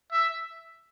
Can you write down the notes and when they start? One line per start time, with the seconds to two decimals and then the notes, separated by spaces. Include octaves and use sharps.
0.12 E5